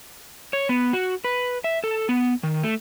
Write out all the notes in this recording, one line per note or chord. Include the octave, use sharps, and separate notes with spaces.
C#5
B3
F#4
B4
E5
A4
B3
D#3
A3